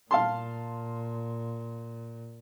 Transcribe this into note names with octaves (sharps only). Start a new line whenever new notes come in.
A#2 F5 A5 C6